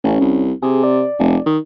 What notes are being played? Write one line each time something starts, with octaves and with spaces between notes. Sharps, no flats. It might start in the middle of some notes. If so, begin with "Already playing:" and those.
A1 C#4
C2
C3 G#4
D5
F1
D#3